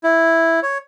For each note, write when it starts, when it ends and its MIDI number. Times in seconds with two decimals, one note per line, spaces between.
0.04 0.60 64
0.63 0.78 73